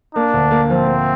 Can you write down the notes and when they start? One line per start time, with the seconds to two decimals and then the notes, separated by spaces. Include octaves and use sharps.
0.15 A#3 D4
0.33 D2
0.51 A#3
0.69 F3 C4
0.87 A#3